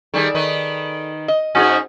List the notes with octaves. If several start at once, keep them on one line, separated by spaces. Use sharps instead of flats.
D#3 G3 G#4 A4 D5
D#3 D#4 B4
D#5
G#2 C#4 D#4 F4 F#4 G#4